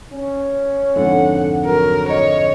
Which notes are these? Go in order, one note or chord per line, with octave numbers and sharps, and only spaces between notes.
C#4
F2 G#2 D3 F#5
F#3 F#4 A#4
C#5 D#5